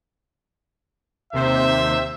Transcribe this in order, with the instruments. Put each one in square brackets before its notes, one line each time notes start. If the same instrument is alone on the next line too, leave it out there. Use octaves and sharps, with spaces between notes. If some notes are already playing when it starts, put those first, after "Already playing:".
[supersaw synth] D#2 C3 C5 [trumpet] E5